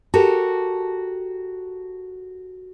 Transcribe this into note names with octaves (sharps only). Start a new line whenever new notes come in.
F#4 G4 A4 A#4